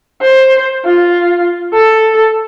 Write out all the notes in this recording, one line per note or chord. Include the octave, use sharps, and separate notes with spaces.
C5
F4
A4